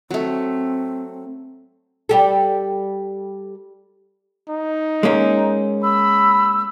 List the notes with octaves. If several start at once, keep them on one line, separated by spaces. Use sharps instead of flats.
F#3 A3 C4
G3 G4 A4
D#4
G#3 A#3 C#4
B5 E6